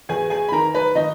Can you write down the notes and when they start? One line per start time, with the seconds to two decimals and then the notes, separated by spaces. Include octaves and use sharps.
0.09 E2 G#4 G#5
0.30 G#4 G#5
0.48 B5
0.52 D#3 A#4 A#5
0.74 B4 B5
0.95 D#3 D#4 D#5